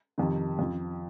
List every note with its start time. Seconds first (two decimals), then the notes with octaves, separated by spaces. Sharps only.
0.18 F2 C3 D#3
0.59 F2 F3